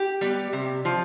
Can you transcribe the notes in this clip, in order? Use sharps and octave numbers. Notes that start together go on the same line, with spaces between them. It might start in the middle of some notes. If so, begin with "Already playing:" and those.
Already playing: G4
G3 B3
C3
F3